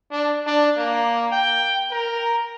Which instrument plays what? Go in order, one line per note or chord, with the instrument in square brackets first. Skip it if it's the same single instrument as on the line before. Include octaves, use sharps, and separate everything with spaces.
[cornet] D4
D4
A#3
G5
A#4